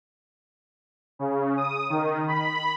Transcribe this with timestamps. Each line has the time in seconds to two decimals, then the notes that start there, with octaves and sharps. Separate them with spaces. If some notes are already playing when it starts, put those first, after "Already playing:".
1.19 C#3
1.57 D#6
1.90 D#3
2.28 B5